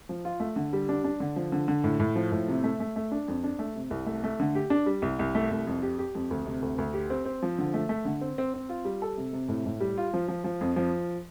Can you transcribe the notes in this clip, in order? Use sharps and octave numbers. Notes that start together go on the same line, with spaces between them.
F3
F4
A3
D3
G3
D4
D4
D3
F3
D3
D3
A2
A2
F3
A2
C3
A3
A3
A3
D4
F2
D4
A3
C3
C2
A3
A3
D3
G4
D4
G3
C2
C2
A3
C2
F2
G4
G4
F2
D2
C3
D2
D2
G4
C4
C4
F3
D3
A3
A3
D3
C4
C4
C4
F4
G3
A4
C3
C3
A2
A2
G3
F4
F3
F3
F3
F2
F3